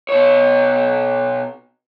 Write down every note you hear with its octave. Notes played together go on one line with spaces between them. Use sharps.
B2 C#5